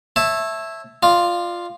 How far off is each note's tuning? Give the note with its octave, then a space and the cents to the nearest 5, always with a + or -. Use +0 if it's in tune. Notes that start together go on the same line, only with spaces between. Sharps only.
C#5 -25 E5 +0 A5 +0
F4 +0 D5 +40